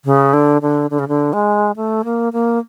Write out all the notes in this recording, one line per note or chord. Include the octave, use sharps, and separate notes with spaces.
C#3
D3
D3
D3
C#3
D3
G#3
A3
A#3
A#3